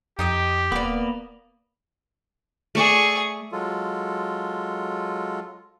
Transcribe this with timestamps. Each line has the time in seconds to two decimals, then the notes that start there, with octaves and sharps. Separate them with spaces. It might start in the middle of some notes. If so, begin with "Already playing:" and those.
0.19 F2 D#4 G4 D#5 G5
0.72 D#1 A#3 B3 B4 D5
2.75 A3 G#4 D5 E5 C#6
3.52 F#3 G#3 F4 A4